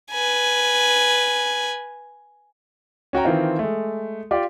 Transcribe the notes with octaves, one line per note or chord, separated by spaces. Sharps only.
B4 G#5
C#4 F#4 G5 A#5
D#3 E3 C4 F4
G#3 A3
F4 G4 D5